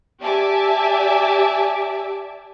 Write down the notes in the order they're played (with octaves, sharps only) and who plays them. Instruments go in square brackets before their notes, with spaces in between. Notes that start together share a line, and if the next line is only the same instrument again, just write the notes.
[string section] G4 D5 E5 G#5 A5 D6